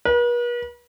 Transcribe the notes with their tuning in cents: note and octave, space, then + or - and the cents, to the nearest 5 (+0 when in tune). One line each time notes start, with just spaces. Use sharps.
B4 -45